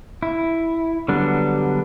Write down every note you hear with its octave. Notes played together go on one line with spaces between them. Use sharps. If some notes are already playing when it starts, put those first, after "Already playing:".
E4
D3 F#3 G3 B3 D4